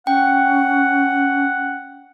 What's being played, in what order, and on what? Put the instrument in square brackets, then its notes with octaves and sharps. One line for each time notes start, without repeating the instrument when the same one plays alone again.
[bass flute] C#4 [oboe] F#5 [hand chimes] G5